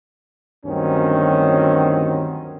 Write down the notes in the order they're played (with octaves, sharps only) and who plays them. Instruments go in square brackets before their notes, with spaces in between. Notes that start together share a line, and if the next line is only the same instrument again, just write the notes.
[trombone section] D2 G2 D#3 F#3 C4 C#4